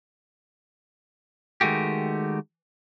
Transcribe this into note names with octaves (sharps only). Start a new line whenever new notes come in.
D#3 G#3 A3 F#4 G4